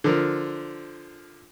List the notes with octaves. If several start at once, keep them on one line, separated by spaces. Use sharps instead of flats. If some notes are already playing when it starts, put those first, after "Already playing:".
D3 F3 A#4